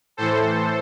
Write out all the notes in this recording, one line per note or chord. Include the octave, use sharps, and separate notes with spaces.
A2 E3 A4 C5